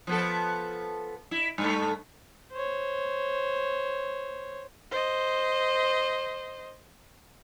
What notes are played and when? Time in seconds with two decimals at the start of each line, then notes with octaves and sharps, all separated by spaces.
0.07 F3 B3 A4
1.31 E4
1.58 G2 A3
2.52 C5 C#5
4.91 C5 D#5